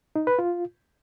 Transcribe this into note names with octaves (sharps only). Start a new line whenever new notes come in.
D#4
B4
F4